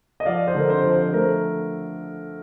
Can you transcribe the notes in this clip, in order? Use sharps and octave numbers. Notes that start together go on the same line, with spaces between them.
D#5
F3 D5 F5
C5 D#5
D3 A#4
C5
F3
C5
C5
A3 A#4